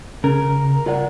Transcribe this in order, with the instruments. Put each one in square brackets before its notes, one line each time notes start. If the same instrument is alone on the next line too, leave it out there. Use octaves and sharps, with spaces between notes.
[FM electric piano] C#3 [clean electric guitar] A#4
[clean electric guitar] F4 D5 F#5